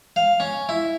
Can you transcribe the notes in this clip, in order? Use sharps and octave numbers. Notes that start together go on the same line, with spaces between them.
F5
C#4
E4